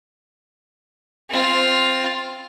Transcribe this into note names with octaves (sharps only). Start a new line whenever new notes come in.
C4 F4